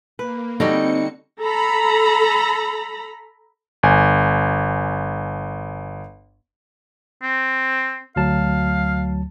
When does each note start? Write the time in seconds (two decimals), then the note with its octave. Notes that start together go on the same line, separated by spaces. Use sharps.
0.19 A#3 B4
0.60 D3 G3 C4 D#4 F#4 C#7
1.40 A4 A#5 B5
3.83 G1 G#5
7.22 C4
8.16 D2 F#3 F5 A5